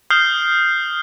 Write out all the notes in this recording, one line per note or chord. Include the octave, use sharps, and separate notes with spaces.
D#6 F6 G6 C7 G7